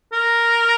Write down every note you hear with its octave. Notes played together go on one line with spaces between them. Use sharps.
A#4